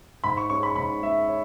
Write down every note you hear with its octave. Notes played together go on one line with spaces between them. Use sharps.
G#2 B5
C#6
G#3 C#4 C#6
B5
G#2 B5
G#3 C#4 E5
C#5